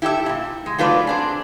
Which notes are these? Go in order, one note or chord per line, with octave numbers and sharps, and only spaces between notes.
E4 G4 A4 E5
G2 A#2
G#3
F#3 A3 F4 B4 D5
C4 D4 G#4